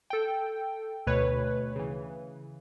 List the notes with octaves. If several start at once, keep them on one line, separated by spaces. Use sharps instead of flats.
A4 G5
D2 B2 B4 C#5
C#3 E3